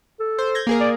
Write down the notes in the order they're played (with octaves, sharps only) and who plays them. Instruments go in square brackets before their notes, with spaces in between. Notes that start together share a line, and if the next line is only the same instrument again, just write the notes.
[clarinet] A4
[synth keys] C5
G6 G#6 A#6
A#3 G#4 A#4
[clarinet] D5